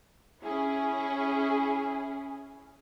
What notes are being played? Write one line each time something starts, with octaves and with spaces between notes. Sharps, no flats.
C#4 E4 G#4